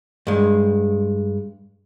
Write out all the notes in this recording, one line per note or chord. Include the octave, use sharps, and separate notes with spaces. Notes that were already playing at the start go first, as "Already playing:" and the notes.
G2 G#3